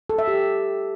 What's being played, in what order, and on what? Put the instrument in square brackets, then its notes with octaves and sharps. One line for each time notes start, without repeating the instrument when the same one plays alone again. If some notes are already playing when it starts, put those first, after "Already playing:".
[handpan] A4
E5
G4